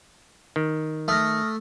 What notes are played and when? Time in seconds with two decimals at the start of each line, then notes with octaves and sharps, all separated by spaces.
0.56 D#3
1.08 A3 D#6 F6 A#6